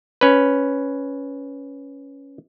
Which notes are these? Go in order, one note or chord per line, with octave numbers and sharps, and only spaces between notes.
C#4 B4